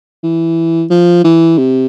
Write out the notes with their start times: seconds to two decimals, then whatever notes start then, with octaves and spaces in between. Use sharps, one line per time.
0.24 E3
0.90 F3
1.24 E3
1.58 C3